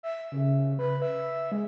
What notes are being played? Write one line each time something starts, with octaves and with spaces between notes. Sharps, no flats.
E5
C#3
B4
E5
G#3